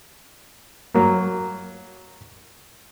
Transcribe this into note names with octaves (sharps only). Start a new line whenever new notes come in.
F#3 A#3